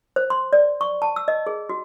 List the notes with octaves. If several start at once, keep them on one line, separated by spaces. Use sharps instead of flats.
C5
C6
D5
C#6
A5
E6
D#5
G#4
F#4